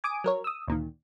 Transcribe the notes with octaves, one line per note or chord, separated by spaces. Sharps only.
G#5 D6 D#6 D7
F#3 A#4 C#5
D#6 E6
D2 A#2 D#3